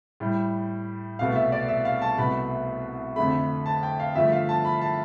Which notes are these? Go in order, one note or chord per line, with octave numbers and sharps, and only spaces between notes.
A2 G3
C2 B2 A3 F5
E5
D5
E5
F5
A5
C2 B2 A3 B5
F2 D3 A3 B5
A5
G5
F5
G2 D3 F3 A3 E5
F5
A5
B5
A5